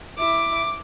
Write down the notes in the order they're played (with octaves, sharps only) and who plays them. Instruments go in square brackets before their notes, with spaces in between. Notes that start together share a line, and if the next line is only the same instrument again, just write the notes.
[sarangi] E4 [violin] D6